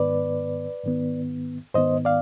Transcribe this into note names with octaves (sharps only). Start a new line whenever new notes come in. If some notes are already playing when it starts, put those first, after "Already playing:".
Already playing: G#2 D#3 B3 B4 D5
G#2 D#3 B3
G#2 D#3 B3 C5 D#5
D5 F5